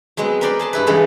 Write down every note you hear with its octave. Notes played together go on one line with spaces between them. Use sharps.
F#3 G#3 B3 C4
A#4 B4 D5 G5 B5 C6
G#4 A5 C6
G2 E4 B4
C#3 E3 G#3 D#4 G#4 A4